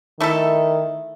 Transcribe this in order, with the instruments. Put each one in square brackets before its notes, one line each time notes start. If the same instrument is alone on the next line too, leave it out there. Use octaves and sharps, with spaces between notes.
[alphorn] D#3 [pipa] A3 E4 A4